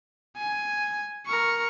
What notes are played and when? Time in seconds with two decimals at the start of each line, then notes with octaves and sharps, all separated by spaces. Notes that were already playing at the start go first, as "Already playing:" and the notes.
0.37 G#5
1.26 A#4 C#6